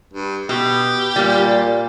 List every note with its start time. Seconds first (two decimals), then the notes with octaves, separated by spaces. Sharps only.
0.13 G2
0.49 B2 G4
1.16 A#2 G3 A#3